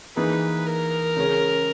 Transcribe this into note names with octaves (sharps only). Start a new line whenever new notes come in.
E3 A#3 D#4 G#4 B4
A#4
C#3 G#3 C#4